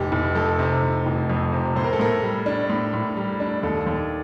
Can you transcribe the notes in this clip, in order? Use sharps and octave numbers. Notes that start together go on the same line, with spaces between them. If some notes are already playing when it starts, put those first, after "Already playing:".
Already playing: F1 G4
F1
F2 A4
C3
F1
F1
F2
C3
A2 C5
A#4
A4
A2 A#4
G3
D4
A2
A2
G3
D4
D#2 A4
D#2